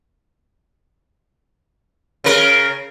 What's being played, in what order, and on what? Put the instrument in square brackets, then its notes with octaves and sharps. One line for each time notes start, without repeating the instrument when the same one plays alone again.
[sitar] C#3 A#4